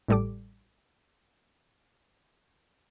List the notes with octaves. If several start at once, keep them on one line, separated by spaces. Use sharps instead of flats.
A1 A2 G3 A4 D6